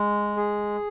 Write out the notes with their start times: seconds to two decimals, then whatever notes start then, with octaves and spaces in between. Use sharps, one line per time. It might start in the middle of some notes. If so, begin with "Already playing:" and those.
Already playing: G#3
0.37 G#4